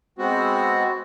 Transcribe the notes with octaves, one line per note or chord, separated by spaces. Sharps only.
G#3 B3 C4 F#4